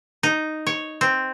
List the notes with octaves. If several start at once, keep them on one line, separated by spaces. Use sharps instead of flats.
D#4
C#5
C4